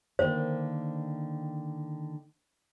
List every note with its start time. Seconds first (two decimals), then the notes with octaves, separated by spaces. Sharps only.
0.19 D3 D#3 A#3 C5